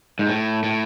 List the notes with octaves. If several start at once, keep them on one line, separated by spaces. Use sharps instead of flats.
G#2
A2
A2